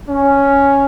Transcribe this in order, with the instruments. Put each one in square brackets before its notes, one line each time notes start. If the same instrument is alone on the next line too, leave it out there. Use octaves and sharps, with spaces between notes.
[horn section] C#4